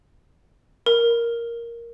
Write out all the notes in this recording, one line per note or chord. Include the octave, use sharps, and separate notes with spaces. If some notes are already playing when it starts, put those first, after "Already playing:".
A#4